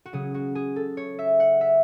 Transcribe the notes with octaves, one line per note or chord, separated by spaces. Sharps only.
F#4
C#3 F#3 G#4
F#4
G#4
A4
C#5
E5
F#5
E5